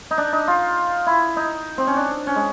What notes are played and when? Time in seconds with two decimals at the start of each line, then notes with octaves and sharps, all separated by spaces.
0.11 D#4
0.18 D4
0.32 D#4
0.48 F4
1.07 E4
1.36 D#4
1.78 C4
1.87 C#4
1.97 D4
2.27 C#4
2.36 G#3